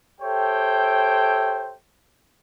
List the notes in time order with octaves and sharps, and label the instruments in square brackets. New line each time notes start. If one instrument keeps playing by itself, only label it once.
[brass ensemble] G4 A4 C5 C#5 E5 G5